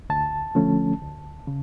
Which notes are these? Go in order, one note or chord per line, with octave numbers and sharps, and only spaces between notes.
D2 A5
D3 F3 A3 C#4
D2
C#3